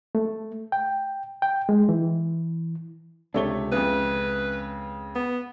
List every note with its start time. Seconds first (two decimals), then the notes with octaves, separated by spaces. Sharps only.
0.15 A3
0.72 G5
1.42 G5
1.69 G#3
1.89 E3
3.34 C#2 C3 A3 D4 C#5 G7
3.72 F2 C#3 B4
5.15 B3